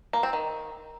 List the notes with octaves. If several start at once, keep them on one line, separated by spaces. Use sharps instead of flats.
A#3
C4
D#3